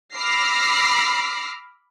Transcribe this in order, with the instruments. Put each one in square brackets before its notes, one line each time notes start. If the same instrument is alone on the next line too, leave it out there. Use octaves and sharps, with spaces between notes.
[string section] B5 D6 E6 F6 A#6 C7